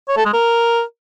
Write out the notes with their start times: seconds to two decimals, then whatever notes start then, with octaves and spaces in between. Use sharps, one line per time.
0.09 C#5
0.17 A4
0.25 G#3
0.34 A#4